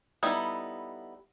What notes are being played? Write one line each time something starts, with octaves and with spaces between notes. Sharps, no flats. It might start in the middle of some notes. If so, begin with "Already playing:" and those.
G3 B3 D#4 E4 A4